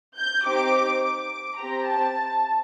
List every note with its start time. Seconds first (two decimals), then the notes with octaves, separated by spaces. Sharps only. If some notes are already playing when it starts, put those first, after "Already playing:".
0.17 G6
0.45 C4 D#4 G4 D6
1.02 D6
1.58 C4 G4 A#5
1.87 A5